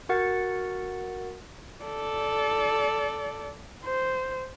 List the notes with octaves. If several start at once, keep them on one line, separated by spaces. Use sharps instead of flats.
F#4 A#4 F#5 A6 C#7
A4 D5
C5